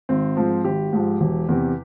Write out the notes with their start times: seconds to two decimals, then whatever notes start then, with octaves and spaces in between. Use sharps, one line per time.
0.09 G#1 C4
0.37 G#2 F3
0.65 G#1 G4
0.93 G#2 F3
1.21 E1
1.49 E2 C3